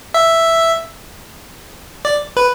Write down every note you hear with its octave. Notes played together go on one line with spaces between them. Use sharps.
E5
D5
B4